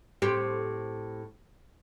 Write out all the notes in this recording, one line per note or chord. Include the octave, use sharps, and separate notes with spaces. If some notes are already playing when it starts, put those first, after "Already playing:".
A2 C4 G4